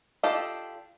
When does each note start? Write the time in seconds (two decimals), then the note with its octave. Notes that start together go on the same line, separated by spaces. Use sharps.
0.23 D4 F4 G4 A4 D#5